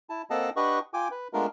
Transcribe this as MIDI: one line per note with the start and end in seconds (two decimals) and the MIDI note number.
0.10 0.22 64
0.10 0.22 81
0.30 0.50 58
0.30 0.50 60
0.30 0.50 69
0.30 0.50 75
0.30 0.50 78
0.30 0.50 81
0.56 0.79 62
0.56 0.79 67
0.56 0.79 71
0.56 0.79 75
0.56 0.79 78
0.56 0.79 85
0.94 1.08 65
0.94 1.08 79
0.94 1.08 80
0.94 1.08 86
1.11 1.28 71
1.33 1.47 56
1.33 1.47 57
1.33 1.47 59
1.33 1.47 62
1.33 1.47 65
1.33 1.47 70